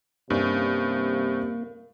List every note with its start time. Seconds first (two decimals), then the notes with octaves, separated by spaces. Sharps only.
0.30 G2 C3 A#3 C#4 D4